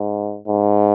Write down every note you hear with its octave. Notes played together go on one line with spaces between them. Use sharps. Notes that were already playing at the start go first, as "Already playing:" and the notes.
Already playing: G#2
G#2